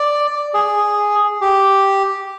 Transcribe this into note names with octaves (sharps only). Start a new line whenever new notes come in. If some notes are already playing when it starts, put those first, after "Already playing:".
Already playing: D5
G#4
G4